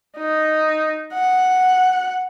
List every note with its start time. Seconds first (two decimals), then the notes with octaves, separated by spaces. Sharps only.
0.18 D#4
1.14 F#5